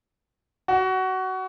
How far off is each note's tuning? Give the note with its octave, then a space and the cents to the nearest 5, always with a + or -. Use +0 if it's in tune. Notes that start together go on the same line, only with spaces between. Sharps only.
F#4 +20